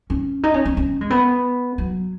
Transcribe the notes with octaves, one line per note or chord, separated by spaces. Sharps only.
C#4
D#4
C#4
C#4
C#4
G#3
B3
F#3